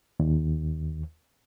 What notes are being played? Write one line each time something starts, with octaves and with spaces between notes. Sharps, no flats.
D#2